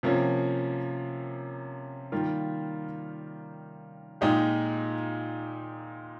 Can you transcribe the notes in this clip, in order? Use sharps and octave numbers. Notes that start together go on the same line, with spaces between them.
C3 F3 A#3 C#4
D#3 G3 A#3 F4
A#2 G#3 D#4 G4